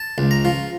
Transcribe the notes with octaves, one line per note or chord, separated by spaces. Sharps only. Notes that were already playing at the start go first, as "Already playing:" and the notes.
Already playing: A5
C#2
A#5
F3